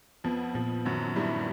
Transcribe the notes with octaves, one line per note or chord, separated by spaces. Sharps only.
F2 F3 B3
F2 A#2 F3
F#2 D#3 F#3
G2 G3 E4